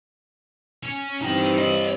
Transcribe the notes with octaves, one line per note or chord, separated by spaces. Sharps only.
C#4
G2 E3 C4 D#4 G5
C#5 D#5